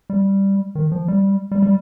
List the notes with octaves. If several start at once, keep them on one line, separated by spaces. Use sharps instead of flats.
G3
D#3
F3
G3
G3
G3